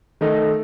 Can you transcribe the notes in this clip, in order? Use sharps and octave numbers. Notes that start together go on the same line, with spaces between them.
D#3 A3 D#4